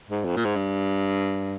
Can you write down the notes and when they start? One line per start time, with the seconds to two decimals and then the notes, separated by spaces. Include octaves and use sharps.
0.10 G#2
0.25 F2
0.36 A#2
0.45 G#2
0.56 G2